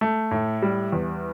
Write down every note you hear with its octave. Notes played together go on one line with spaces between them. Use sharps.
A3
A2
G3
E2